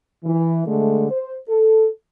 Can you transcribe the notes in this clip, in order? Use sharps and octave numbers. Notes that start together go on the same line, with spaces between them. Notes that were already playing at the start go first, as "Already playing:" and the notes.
E3
D3 G#3 A3
C5
A4